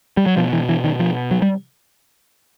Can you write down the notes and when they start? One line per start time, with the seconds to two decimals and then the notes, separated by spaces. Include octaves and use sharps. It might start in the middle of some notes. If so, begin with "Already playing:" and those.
0.17 G3
0.26 F#3
0.37 B2 F3
0.53 E3
0.69 E3
0.84 D#3
0.99 F3
1.31 F#3
1.42 G3